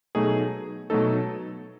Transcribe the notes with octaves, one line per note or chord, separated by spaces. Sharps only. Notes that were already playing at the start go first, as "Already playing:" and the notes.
B2 F#3 A3 D#4 G#4
B2 F#3 A3 D#4 A4